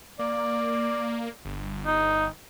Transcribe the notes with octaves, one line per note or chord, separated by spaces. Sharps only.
A#3 D5
G1
D#4